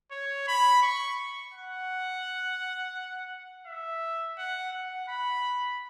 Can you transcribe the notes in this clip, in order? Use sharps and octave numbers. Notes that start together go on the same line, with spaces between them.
C#5
B5
C#6
F#5
E5
F#5
F#5
B5